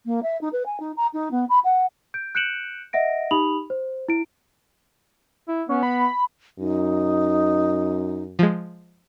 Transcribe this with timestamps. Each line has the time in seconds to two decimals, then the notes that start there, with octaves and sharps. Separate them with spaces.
0.06 A#3
0.23 E5
0.41 D#4
0.53 B4
0.66 G#5
0.80 D#4
0.97 A#5
1.13 D#4
1.31 B3
1.49 B5
1.64 F#5
2.14 G6 D7
2.35 F#6 G6 C#7 D7 E7 F#7
2.93 D#5 E5 F#5 A#6 D7
3.31 D#4 G4 B5 D#6 F7 F#7
3.70 C5
4.09 E4 D7
5.48 E4
5.69 B3 C#4
5.83 B5
6.59 F#2 D#4
8.39 F3 G#3